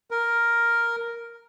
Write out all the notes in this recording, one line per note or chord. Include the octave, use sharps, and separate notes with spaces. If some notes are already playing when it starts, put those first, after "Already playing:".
A#4